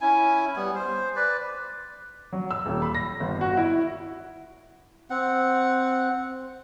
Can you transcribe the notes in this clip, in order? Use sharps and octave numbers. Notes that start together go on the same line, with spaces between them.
C#4 E4 G#5
G3 B3
C5
B4 D5
F#3
E6
D#1
B5
A#6
G1
F#4
E4
C4 F#5